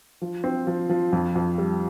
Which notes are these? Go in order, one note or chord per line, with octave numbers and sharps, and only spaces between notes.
F3
C4
F3
F3
F2
F2
G3